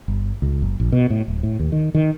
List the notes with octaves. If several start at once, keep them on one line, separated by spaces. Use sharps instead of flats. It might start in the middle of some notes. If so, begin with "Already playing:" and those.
G1
C#2
F#1
A#1
B2
A2
D1
A2
D#2
D#3
D#3